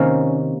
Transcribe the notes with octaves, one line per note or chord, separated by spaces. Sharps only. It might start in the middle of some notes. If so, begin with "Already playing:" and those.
Already playing: C3 D#3 A#3 C#4